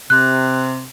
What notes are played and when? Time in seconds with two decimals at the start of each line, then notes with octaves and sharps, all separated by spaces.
0.10 C3 F#6